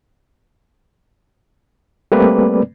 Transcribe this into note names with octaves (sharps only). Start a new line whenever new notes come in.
G3 A3 A#3 C4 B4 D5